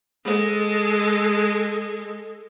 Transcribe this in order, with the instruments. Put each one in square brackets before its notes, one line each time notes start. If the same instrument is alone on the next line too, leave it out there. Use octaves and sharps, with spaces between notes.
[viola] G#3 A4